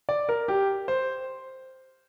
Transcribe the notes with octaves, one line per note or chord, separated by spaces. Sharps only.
D5
A#4
G4
C5